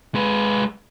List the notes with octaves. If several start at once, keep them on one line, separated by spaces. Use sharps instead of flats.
G#3 B4